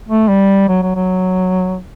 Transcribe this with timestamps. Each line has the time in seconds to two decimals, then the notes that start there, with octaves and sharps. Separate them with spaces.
0.09 A3
0.28 G3
0.68 F#3
0.82 F#3
0.96 F#3